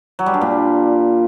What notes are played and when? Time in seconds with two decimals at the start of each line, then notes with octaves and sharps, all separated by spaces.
0.19 F#3
0.26 G3
0.34 D4
0.41 A#2